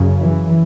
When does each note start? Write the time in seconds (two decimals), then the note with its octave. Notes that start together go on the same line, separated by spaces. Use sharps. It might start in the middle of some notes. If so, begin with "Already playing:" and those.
Already playing: F#2 C#3
0.22 E3